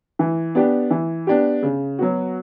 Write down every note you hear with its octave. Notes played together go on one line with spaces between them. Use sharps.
E3
B3 D4 G4
E3
B3 D4 G4
C#3
F#3 B3 F#4